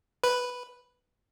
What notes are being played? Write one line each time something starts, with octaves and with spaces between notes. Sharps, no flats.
B4